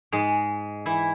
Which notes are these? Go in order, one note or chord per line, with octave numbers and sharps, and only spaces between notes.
G#2 G#3
E3 E4